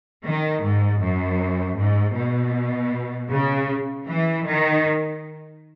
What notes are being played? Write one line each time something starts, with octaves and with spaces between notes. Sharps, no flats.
D#3
G#2
F#2
G#2
B2
C#3
E3
D#3